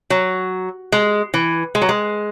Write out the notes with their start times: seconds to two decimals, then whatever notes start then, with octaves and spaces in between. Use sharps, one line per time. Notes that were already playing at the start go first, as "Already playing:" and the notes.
0.10 F#3
0.92 G#3
1.34 E3
1.75 G#3
1.82 F#3
1.89 G#3